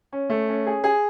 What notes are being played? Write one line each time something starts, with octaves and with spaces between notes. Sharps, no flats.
C#4
A3
C#4
G#4
G#4